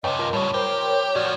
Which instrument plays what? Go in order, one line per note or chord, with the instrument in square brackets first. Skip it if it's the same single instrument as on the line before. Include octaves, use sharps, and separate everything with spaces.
[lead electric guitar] F#2 C3 [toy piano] B4 C#5 G5 [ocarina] D#5
[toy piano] F4 A5 [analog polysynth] A#4 F5
[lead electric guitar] A2 C#3 [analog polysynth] G3 [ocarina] C#5
[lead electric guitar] G4 [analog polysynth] A#4 C5 G5 [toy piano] B5
[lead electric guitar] A2 F3 [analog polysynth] F#4 E7 [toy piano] D5